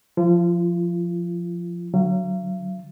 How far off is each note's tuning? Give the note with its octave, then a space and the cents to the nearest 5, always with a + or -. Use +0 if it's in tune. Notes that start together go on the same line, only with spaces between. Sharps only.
F3 +0 F4 -30
D3 +10 F#3 +0 F5 -45